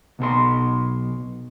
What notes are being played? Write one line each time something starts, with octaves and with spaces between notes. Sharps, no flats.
B1 B2 A4 C6